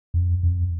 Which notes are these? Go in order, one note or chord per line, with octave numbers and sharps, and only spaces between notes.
F2
F2